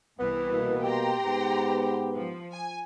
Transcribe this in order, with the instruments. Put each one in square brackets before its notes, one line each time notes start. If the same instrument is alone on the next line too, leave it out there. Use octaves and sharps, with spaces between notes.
[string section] C2 E3 [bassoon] B3
[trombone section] B2 A#3
[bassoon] G4 [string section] G5 A#5 C6
[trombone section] G#2 B3
[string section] F3
G#5